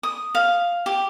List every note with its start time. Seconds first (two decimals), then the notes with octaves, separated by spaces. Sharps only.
0.03 D#6
0.35 F5
0.86 G4